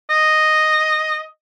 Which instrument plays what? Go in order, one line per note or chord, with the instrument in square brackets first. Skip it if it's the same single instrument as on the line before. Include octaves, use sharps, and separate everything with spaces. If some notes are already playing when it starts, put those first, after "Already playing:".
[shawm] D#5